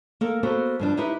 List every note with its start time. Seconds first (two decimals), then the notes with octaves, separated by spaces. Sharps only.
0.21 A#3 A4
0.43 A#3 B3 F#4 A4 C5
0.80 G2 F3 D4
0.97 D#4 E4 G4 B4